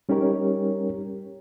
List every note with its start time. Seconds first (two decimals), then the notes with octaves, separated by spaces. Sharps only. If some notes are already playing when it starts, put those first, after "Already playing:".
0.09 G3 C#4 D#4 G4 A#4 C#5